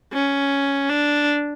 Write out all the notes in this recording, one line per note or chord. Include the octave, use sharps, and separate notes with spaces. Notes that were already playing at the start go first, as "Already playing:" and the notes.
C#4
D4